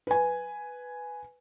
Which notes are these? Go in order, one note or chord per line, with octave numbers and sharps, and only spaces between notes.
B4 G#5